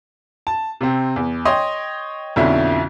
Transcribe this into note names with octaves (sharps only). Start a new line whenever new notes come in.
A5
C3 C4
E2
C#5 D#5 G5 C6
B1 F2 D3 C#4 E4